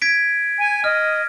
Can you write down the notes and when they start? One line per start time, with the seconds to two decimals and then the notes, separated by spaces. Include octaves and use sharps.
0.02 G#6 B6 D7
0.58 G#5
0.84 D#5 F6